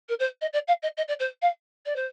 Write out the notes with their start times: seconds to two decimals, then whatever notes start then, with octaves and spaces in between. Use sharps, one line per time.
0.09 A#4
0.19 C5
0.41 D#5
0.53 D5
0.68 F5
0.82 D#5
0.97 D#5
1.08 D5
1.19 C5
1.42 F5
1.86 D5
1.96 C5